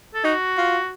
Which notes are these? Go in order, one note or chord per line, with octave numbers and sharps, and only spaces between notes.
A4
D#4 F#4
F4